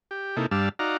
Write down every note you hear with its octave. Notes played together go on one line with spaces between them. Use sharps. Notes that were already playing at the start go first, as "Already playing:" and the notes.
G4
C3 A#3 D#4 E4 A4
G2 G3 D4 F5 A5 E6
D#4 F#4 D5 F5 A#5